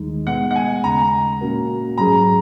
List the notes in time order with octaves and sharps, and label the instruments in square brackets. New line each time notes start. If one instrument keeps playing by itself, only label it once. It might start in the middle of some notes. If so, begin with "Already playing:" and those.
Already playing: [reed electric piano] D#2 D#3 G#3 D#4
[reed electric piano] B2 G#3 B3 [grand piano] F#5
[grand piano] F#5
G#5
[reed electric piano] D#2 C#3 G#3 C#4 [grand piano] A#5
[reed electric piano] A#2 A#3 C#4 F#4 A#4
[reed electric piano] G#2 F#3 C#4 G#4 [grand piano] A#5